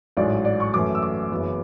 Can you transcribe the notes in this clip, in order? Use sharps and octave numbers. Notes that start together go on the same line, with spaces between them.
A1 G#2 F#3 D5
D5
C#6
F#2 E3 A3 D6
E6
D6
F#1 F#2 E3 B3